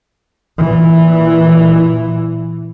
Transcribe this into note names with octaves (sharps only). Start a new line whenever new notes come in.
A#2 E3